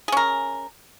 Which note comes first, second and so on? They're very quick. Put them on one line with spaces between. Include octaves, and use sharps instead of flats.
G#4 C#4 A#4